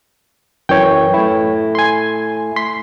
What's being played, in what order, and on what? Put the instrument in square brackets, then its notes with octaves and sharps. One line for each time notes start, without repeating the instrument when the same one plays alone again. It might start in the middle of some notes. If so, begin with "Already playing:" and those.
[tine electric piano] F#2 E3 [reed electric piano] C#5 G5
[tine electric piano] A3 E4
[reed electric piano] G#5 C6
[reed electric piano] C6 [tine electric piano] B6